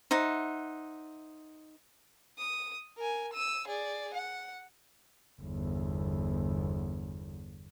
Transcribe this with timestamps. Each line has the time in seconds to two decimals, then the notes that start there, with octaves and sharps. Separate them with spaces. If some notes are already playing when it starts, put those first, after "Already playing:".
0.11 D#4 C5 E5 F#5
2.39 D#6
2.97 A#4 G#5
3.34 E6 D#7
3.68 G#4 D5
4.14 F#5
5.42 G1 E2